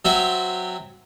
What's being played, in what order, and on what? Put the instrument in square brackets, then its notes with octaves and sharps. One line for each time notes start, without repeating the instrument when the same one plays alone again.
[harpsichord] F#3 C4 E5